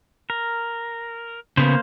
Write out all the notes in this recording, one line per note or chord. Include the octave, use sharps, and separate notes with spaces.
A#4
C#3 A#3 B3 C5